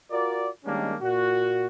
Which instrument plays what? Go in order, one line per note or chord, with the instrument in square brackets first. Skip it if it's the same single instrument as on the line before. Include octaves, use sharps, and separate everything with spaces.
[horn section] F4 F#4 A#4 D5
D#3 G3 G#3 A#3 C#4 D4
A#2 F#4